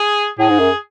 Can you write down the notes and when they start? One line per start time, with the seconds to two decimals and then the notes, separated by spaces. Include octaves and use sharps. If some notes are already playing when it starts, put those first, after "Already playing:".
Already playing: G#4
0.39 A2 G#4
0.50 G#2
0.59 F#2